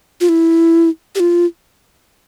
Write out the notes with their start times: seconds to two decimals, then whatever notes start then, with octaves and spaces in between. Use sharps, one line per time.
0.21 F4
0.29 E4
1.15 G4
1.20 F4